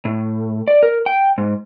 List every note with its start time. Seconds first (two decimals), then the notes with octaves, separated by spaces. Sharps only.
0.05 A2
0.68 D5
0.83 A#4
1.06 G5
1.38 G#2